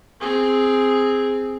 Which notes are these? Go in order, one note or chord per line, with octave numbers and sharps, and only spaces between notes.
C4 G#4